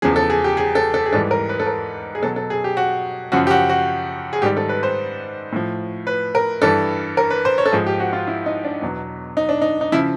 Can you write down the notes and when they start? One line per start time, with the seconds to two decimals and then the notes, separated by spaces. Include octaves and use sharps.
0.02 E2 C#3 F3 G#4
0.16 A4
0.30 G#4
0.44 G4
0.57 G#4
0.75 A4
0.94 A4
1.06 G#4
1.13 G#2 E3 G3 A4
1.31 A#4
1.49 B4
1.60 A4
1.67 A#4
2.15 G#4
2.22 B2 F#3 A4
2.36 A4
2.50 G#4
2.64 G4
2.77 F#4
3.32 F#2 C#3 F3 F#4
3.47 G4
3.51 F#4
3.69 F#4
4.33 G#4
4.42 G#2 D#3 G3 G4
4.57 A4
4.69 B4
4.83 C5
5.52 A2 F3
6.07 B4
6.35 A#4
6.62 G2 E3 G3 A4
7.17 A#4
7.30 B4
7.45 C5
7.58 C#5
7.66 A4
7.72 G#2 F3 G#4
7.86 G4
8.00 F#4
8.13 F4
8.27 E4
8.46 D#4
8.64 D4
8.82 E2 B2 F#3
9.37 D#4
9.49 D4
9.62 D#4
9.81 D#4
9.92 C#3 F3 E4